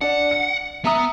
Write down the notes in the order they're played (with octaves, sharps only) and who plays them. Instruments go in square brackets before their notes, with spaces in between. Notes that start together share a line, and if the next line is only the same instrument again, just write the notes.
[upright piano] D4 [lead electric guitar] F#5
[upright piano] C#7
[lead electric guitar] B3 [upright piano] E5 A#5 D#6